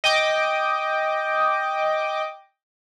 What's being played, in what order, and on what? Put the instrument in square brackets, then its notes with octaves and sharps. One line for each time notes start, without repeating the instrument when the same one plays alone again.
[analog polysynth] D#5 G5 D6